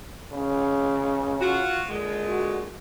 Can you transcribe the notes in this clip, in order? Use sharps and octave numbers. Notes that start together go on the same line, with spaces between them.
C#3
F4 F#4
A#2 D3 G#3
F#4